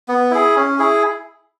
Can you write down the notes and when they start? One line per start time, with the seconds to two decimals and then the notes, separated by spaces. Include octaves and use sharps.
0.08 B3
0.31 E4 G#4
0.56 C#4
0.79 E4 G#4